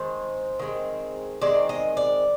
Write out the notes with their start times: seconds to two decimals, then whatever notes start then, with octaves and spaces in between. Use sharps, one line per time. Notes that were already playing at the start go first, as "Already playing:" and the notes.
Already playing: D#3 G#3 C4 C5
0.59 D#3 G#3 C4
1.41 D#3 G#3 C4 D5
1.69 D#5
1.97 D5